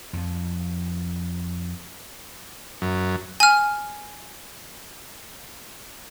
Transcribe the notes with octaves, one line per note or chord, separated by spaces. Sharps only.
F2 F3
F#2
G#5 F6